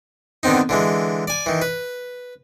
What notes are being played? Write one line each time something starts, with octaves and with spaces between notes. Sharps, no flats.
D3 D#3 B3 C4 D#4
D3 E3 G#3
D5 G#5
D#3 E3
B4